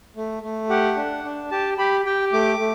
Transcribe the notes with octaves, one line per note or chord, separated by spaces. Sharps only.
A3
A3
G4 F#5
D4
D4
G4 A5
G4 B5
G4 G5
A3 D6
A3